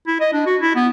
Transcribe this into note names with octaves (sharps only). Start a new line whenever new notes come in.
E4
D#5
D4
F#4
E4
B3